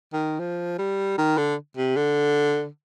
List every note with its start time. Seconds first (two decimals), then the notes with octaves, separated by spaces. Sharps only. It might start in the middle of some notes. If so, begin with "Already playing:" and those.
0.13 D#3
0.40 F3
0.79 G3
1.18 D#3
1.38 D3
1.77 C3
1.96 D3